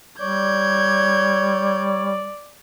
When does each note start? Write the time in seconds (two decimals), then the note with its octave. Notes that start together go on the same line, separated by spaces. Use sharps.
0.21 G3 C#5 D5 G6 G#6